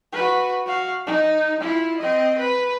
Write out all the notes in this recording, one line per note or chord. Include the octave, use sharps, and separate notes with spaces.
F#4 B4
F#4 F5
D#4
E4 F4
C4 D#5
B4